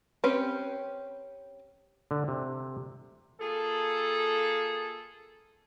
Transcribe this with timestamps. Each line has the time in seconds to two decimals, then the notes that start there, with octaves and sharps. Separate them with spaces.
0.24 C4 C#4 G4 B4
2.11 D3
2.28 C3
3.41 A#3 F4 G#4 A4